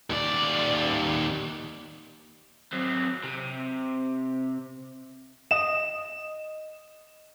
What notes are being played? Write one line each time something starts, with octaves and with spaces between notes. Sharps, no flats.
D#2 D5
F#3 C4
C3
D#5 E7